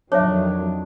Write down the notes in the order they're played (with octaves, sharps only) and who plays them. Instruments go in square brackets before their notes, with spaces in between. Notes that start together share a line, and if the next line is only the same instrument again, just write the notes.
[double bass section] F2 D#3 F#3 [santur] D4 [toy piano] C#5 E5